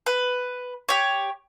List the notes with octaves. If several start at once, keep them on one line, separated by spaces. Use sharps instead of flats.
B4
G4 C#5